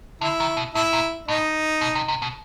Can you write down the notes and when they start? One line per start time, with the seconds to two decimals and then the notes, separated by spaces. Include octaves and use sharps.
0.21 D3 E4
0.40 D#3
0.57 B2
0.75 A2 E4
0.93 A#2
1.28 A2 D#4
1.81 B2
1.95 C3
2.08 C3
2.22 B2